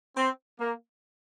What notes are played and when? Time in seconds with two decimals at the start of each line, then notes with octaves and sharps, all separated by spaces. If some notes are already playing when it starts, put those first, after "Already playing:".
0.16 C4
0.59 A#3